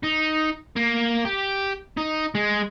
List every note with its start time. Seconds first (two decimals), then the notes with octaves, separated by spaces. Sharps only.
0.04 D#4
0.76 A#3
1.25 G4
1.97 D#4
2.35 G#3